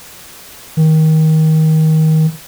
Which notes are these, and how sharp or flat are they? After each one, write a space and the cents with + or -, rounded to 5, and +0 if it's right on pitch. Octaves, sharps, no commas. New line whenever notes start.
D#3 +20